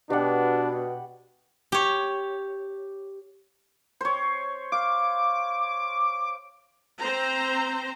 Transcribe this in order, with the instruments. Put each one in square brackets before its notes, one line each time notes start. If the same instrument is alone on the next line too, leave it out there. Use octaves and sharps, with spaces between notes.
[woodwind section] B2 [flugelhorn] D4 [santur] G4 F#5
[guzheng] G4 C#5
[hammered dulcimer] C5 C#5
[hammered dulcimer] F5 [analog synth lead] D6
[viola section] C4 C5 A#5